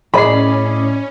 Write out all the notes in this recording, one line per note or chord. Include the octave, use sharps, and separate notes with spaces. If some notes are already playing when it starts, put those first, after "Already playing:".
A2 C#4 G#4 D5 D#5 B5 C7